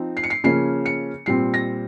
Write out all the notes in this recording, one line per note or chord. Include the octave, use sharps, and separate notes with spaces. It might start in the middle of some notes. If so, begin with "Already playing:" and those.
Already playing: F3 C4 D#4
C7
C#7
C7
C#3 F3 A#3 C#4 C7
C#7
A#2 G3 C4 C7
A#6